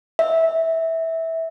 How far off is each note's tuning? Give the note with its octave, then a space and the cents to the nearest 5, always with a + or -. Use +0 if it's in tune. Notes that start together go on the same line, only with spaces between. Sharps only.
E5 -15